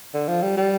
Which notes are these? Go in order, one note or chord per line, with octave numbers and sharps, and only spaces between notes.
D3
F3
G3
G3